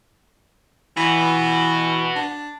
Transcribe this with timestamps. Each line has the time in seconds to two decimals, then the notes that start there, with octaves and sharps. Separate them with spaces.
0.97 E3 F#4 B4
2.16 D4